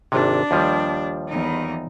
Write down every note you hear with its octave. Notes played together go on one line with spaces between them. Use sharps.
G#1 C3 D4
D#2 F3 G3
E2 D#4